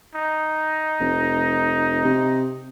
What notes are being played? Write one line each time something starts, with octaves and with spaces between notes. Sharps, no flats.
D#4
F1
C3